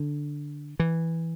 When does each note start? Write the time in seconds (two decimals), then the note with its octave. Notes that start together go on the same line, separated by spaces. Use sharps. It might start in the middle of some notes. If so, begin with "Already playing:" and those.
Already playing: D3
0.80 E3